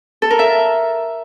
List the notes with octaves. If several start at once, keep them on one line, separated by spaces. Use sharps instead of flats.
A4
A#4
E5